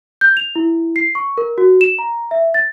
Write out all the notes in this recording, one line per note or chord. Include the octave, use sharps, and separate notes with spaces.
G6
F7
E4
C7
C#6
A#4
F#4
E7
A#5
E5
A6